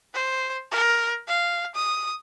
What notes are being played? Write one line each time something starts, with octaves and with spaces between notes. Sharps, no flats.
C5
A#4
F5
D#6